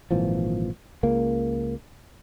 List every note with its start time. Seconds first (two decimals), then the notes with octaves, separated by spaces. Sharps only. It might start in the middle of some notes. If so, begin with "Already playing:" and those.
0.11 G#1 A#2 E3 F3
1.03 C#2 C#3 A#3